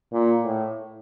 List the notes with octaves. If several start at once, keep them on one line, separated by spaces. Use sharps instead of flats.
A#2
A2